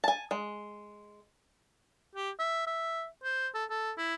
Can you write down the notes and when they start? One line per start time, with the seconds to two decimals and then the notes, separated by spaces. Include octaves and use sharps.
0.04 G#5 A5
0.31 G#3
2.15 G4
2.39 E5
2.67 E5
3.24 C5
3.55 A4
3.70 A4
3.98 E4